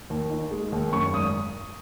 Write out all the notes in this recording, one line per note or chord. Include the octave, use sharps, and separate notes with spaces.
D#2
D#4
G#3
D#2
F#2 C#6
G#1 D#6